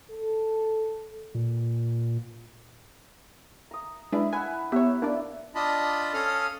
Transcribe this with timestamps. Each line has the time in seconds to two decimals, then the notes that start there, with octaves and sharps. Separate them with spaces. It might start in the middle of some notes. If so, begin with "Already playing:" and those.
0.11 A4
1.35 A#2
3.71 A#5 D#6
4.12 G#3 D4 E4 B4
4.33 B4 F#5 G#5 E6
4.72 B3 G4 C#5 E5
5.02 A#3 D4 D5
5.55 D4 F4 D#5 A5 B5
6.14 C#4 A4 F5 D#6 F6